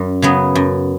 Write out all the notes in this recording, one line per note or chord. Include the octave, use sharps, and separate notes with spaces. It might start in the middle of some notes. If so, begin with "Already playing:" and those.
Already playing: F#2
C#3 F#3 B3
F#2